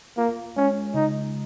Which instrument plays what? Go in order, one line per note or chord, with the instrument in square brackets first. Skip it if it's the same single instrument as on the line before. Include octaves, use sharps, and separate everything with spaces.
[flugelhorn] A#3 [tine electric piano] F4
[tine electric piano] G#3 [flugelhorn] C#4
[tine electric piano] C#3 [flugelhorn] D#4